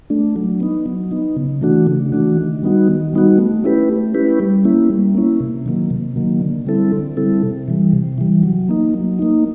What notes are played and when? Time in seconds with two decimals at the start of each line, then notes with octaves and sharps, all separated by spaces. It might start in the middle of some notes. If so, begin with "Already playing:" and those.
0.10 A3 D4
0.36 F#3
0.60 B3 D#4
0.86 F#3
1.11 B3 D#4
1.36 C#3
1.61 E3 A3 D4 F#4
1.87 C#3
2.12 E3 A3 D4 F#4
2.37 D#3
2.63 G3 B3 D#4 F#4
2.88 D#3
3.13 G3 B3 D#4 F#4
3.38 A3
3.64 C#4 E4 G4 B4
3.89 A3
4.14 C#4 E4 G4 B4
4.40 G3
4.65 A#3 C#4 E4
4.90 G3
5.15 A#3 C#4 E4
5.40 C3
5.66 D#3 F#3 A#3
5.90 C3
6.16 D#3 F#3 A#3
6.41 D3
6.67 G3 C4 E4 A4
6.92 D3
7.17 G3 C4 E4 A4
7.43 C3
7.68 E3 G3
7.93 C3
8.18 E3 G3
8.43 F#3
8.69 A#3 D#4
8.94 F#3
9.19 A#3 D#4